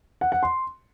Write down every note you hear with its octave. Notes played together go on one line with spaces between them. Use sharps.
F#5
F#5
C6